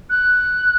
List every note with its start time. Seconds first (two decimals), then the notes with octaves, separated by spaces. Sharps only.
0.10 F#6